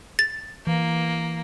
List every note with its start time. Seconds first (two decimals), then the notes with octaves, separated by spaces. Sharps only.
0.19 A6
0.67 E3 A#3